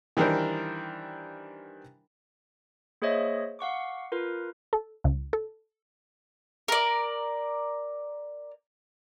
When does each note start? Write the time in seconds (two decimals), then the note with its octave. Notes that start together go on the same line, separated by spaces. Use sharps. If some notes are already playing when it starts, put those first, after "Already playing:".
0.17 D#3 E3 G3 D4 A#4 C5
3.02 A#3 G#4 C5 C#5 D#5 E5
3.59 F5 F#5 C#6 D6
4.12 F4 A#4 B4
4.73 A4
5.04 C#2
5.33 A4
6.68 A#4 D5